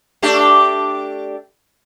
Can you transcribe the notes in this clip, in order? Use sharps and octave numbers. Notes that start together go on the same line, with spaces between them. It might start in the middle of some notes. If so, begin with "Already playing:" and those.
A3 D4 G4